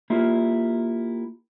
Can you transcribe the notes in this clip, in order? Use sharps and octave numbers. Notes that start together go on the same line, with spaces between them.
A#3 E4 F4 G4